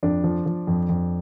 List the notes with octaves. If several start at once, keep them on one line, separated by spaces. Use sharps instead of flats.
F2 D4
F3
F3
F2
F2